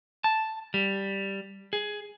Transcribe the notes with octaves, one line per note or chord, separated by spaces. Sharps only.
A5
G3
G#4